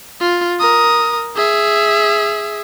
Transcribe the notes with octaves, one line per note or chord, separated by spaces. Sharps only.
F4
A#4 D#6
G#4 E5